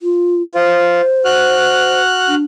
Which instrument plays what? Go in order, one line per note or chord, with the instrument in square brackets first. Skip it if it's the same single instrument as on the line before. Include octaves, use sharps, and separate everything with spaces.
[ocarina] F4
[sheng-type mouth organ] F4 [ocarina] C5
[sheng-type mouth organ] F#4 F6 F#6
[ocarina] D4